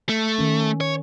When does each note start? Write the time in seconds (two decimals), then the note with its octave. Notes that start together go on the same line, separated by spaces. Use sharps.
0.09 A3
0.39 D#3 C#4
0.81 C#5